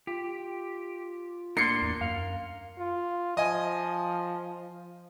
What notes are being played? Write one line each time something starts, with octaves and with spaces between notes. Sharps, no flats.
F4 G4
A2 A#3 D4 A#4 C6 C7 C#7
E2
F#2 F5
F4
F3 D#5 G#5